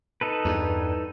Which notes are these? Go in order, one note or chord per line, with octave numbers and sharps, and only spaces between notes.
D#4 A4 B4
E2 G2